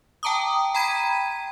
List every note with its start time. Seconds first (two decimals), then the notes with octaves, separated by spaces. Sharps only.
0.23 G5 A5 A#5 D6 D#6
0.74 G5 A#5 B5 G#6 B6 D#7